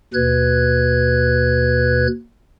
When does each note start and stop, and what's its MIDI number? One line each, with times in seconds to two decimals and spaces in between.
0.14 2.07 39
0.14 2.07 47
0.14 2.07 71
0.14 2.07 90
0.14 2.07 92